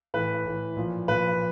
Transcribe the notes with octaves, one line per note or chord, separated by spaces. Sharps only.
A2 E3 B4
A2 E3
A#2 F3
A#2 F3 B4